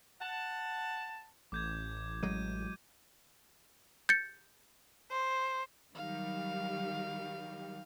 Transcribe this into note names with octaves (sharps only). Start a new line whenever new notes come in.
F#5 A5
A1 D6 G6 G#6
F#3 G#3 D#7
G6 A6 C#7
C5
D#3 F#3 G3 F5